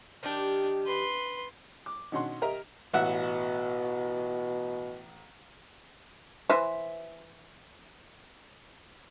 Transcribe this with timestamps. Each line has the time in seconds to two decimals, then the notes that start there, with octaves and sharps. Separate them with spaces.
0.23 D#3 D4 G4
0.86 B4 C6
1.86 D6
2.12 B2 D#3 C#4 D4 F#5 C6
2.42 G4 A#4 D#5 E5 A#5
2.93 A1 B2 E5 F#5
6.49 E3 B4 C5 E5